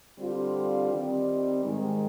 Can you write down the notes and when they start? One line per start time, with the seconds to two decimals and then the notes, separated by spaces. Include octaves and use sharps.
0.17 D3 G3 C4 F4
0.90 D#3 G3 C4 D#4
1.64 G#2 D#3 G#3